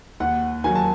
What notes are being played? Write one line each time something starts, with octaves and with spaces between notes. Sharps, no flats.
D#2 F#5
D#3 F#3 G#5
A5